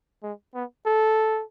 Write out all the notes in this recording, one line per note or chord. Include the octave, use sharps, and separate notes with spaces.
G#3
B3
A4